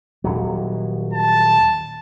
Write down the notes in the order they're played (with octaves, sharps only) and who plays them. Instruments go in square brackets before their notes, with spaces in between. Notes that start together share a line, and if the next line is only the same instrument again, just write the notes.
[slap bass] D#1 F#3
[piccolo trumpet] A5